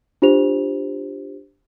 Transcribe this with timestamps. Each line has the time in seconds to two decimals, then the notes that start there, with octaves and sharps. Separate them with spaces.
0.22 D4 F4 G4 C5 F7